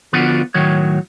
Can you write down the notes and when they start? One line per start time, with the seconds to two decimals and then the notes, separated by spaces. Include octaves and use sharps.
0.13 D3 F3 B3 D4 F4 F#4
0.54 A2 D#3 F#3 C#5